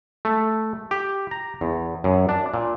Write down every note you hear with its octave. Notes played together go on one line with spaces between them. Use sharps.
A3
G4
A#5
E2
F#2
D4
A#2